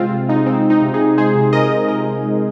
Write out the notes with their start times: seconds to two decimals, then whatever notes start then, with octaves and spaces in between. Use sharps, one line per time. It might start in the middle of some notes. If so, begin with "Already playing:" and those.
Already playing: C3 G#3 C4 F4
0.11 C3
0.29 G#3 D#4
0.46 G#3 C4
0.64 G#3
0.70 D#4
0.82 C3
0.94 D#4 G#4
1.00 C3
1.18 G#3 G#4 C5
1.35 C3
1.53 C3 A#4 D#5
1.71 G#3
1.88 C3 A#4 D#5
2.06 G#3
2.24 G#3